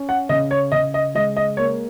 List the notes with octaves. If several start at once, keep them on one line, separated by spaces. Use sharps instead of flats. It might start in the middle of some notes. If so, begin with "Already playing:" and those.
Already playing: C#4
F#5
C#3 D#5
C#5
C#3 D#5
D#5
G#3 D#5
D#5
A#3 C#5